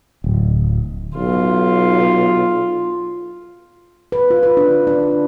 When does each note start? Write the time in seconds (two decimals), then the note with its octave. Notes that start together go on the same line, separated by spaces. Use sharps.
0.24 D1
1.16 B1 F4
4.12 B4
4.30 F4
4.43 B4
4.57 D4
4.87 D4